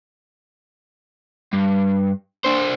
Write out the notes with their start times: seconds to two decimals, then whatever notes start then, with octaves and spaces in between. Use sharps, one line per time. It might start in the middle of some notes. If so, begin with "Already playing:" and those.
1.53 G2
2.44 D4 C5